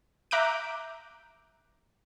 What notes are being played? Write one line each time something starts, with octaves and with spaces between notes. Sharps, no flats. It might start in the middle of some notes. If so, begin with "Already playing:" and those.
E5 A#5 D6 F#6 G6 D7